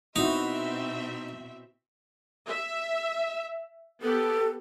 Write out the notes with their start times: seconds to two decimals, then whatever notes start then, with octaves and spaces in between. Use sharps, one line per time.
0.16 B2 C4 D#4 E4 F#4 E5
2.49 E5
4.02 B3 G4 A4